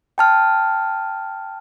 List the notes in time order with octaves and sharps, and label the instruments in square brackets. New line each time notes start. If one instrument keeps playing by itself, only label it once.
[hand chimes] G5 A5 F6